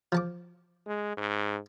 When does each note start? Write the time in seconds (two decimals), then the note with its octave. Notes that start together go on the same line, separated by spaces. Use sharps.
0.12 F3 A5 D6
0.86 G#3
1.17 G#2